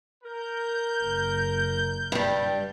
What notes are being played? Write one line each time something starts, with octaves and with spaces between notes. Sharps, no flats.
A#4 G6
F#1
G2 G3